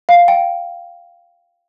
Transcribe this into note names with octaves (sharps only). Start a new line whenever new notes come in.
F5
G5